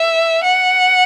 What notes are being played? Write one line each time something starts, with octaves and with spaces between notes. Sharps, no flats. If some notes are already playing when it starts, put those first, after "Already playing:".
Already playing: E5
F#5